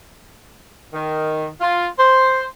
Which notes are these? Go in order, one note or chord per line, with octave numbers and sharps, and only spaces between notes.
D#3
F4
C5